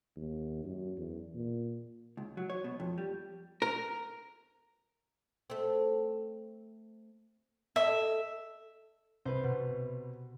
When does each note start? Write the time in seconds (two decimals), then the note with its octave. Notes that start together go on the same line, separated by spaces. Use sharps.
0.16 D#2
0.64 F#2
0.97 E2
1.35 A#2
2.17 C#2
2.37 F#3
2.50 C#5
2.64 B2
2.80 F2
2.98 G3
3.62 A#4
5.50 A3 C4
7.76 A4 D#5 E5
9.25 C2 B4 C5
9.44 B2